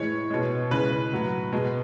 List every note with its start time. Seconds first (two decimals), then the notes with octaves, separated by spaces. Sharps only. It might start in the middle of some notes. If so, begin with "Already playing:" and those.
Already playing: A2 E3 G#3 C#5
0.30 B2 G#3
0.71 C#3 E3 G#3 B4
1.12 A2 F#3
1.52 B2 G#3